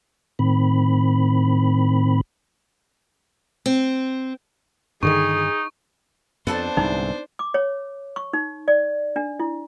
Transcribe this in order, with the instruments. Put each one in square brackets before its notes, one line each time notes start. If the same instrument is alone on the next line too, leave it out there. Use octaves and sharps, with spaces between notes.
[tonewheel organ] A2 D#3 C4 B5
[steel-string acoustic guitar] C4
[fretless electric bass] G2 D3 D#3 [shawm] D#4 [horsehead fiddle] G#4 [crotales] C#6
[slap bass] F2 [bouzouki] B3 A4 A5 [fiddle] D4 C5
[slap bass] C2 G#2 D3 [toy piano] D#4
[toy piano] D6
C#5
C#6
D#4
D5
D4
E4